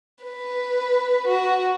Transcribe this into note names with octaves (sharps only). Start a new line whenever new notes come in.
B4
F#4